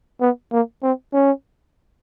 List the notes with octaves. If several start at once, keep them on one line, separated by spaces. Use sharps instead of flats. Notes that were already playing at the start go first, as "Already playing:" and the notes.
B3
A#3
C4
C#4